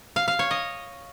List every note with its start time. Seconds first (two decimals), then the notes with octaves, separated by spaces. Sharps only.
0.16 F5
0.28 F5
0.39 C#5
0.51 D#5